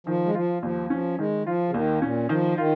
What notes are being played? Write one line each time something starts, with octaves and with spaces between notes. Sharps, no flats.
D#3 F3
G#3
F3 F4
D#2 F3
F3 C#4
D#3 G#3
F3 F4
C#3
D#2 D#3
A#2 C#4
D#3 F3
D#3 F4